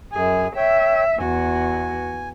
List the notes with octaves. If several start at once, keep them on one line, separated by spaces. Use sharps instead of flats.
F#2 G#4 G#5
C#5 E5 G5
E2 F#4 G#5